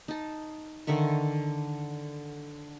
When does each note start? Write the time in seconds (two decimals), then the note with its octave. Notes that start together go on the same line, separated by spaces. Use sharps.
0.08 D#4 A5
0.87 D3 D#3 E5 C#6